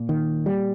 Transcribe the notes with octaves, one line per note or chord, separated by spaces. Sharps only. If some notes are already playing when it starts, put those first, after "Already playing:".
Already playing: A#2
D#3
G3